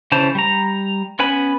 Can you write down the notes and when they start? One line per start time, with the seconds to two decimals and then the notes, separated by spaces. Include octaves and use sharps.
0.12 C#3 E3 C#4 C5 A5
0.35 G3 A#5
1.19 B3 C#4 B4 G#5 B5